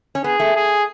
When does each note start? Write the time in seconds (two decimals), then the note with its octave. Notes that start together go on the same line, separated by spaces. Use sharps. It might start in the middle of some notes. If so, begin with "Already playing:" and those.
0.15 C#4
0.24 B3 G#4
0.40 A3
0.56 G#4